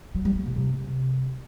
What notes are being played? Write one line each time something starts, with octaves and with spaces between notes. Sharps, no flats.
F#3
G3
A#3
C3
C3